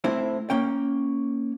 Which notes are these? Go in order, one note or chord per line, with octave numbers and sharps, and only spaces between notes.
A2 C4 E4 C5
A#3 C#4 G5